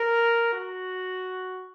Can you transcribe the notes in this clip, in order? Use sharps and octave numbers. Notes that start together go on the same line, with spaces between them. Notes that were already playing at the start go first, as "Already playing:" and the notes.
Already playing: A#4
F#4